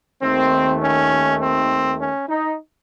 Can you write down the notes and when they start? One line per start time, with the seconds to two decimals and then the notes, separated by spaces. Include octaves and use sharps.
0.21 D#2 D#3 A3 C4
0.80 C#4
1.40 C4
1.99 C#4
2.29 D#4